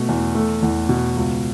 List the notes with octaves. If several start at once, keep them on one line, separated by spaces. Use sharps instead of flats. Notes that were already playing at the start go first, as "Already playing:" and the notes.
Already playing: B2 A3
E2
A3
E2
B2
C#2